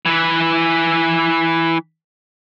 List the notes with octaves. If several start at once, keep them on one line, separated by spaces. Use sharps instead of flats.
E3 B4